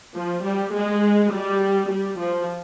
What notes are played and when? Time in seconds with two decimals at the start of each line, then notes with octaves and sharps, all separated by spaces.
0.15 F3
0.43 G3
0.73 G#3
1.32 G3
1.90 G3
2.19 F3